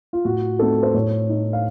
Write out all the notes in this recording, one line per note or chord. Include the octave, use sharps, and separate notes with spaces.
F4
A2 F#4
A3 C4 D#4 A4
C5
A2 C#5
A3 D#4
F5